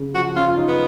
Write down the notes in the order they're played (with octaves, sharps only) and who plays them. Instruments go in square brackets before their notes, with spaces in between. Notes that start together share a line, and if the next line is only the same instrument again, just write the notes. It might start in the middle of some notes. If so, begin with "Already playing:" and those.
Already playing: [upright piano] C#3
[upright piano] F3 [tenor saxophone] F#4
[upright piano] C#4 [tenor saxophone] F4
[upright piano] F4
D#4
[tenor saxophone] B3